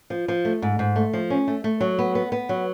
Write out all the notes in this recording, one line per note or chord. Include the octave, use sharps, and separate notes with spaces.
F3
F3
A3
G#2
G#2
A3
F3
C#4
A3
A3
F#3
B3
B3
B3
F#3